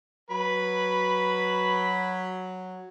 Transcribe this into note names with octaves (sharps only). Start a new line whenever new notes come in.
F#3 B4 B5